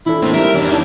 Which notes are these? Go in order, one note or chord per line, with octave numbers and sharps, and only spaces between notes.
E3 D4 E4 A4
A2 A#3 C4
G3 D#4 A#4 E5
E2 D4 G4 C#5
D#4 E4 A5